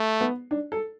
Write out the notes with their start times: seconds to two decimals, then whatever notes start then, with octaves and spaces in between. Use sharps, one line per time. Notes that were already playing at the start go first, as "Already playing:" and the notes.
Already playing: A3
0.21 B3
0.51 D4
0.72 A4